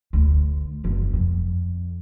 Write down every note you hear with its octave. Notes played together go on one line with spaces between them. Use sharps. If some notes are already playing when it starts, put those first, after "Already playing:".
D2
F#1 E2
F2